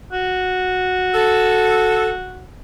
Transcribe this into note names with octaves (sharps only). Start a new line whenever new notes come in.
F#4
A4